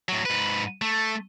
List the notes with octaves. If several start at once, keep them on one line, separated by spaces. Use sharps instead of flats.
A2 F#3
G#2 B4
A3